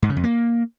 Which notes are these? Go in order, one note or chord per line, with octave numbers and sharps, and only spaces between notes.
G#2
C#3
F2
A#3